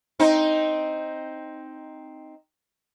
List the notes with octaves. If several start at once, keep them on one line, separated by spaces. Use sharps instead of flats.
C4 D#4